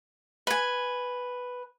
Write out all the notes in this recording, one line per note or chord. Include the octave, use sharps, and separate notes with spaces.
B4 G#5